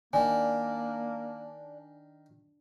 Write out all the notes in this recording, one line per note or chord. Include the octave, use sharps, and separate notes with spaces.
D#3 A#3 D4 G#5